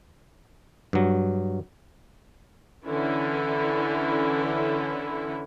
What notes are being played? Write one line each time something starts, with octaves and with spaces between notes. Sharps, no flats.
G2 F#3
D3 E3 C#4 E4